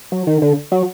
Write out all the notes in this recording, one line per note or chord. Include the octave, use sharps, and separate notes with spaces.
F#3
D#3
D3
F#3